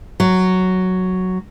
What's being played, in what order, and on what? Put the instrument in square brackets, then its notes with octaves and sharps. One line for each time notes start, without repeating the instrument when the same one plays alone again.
[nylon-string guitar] F#3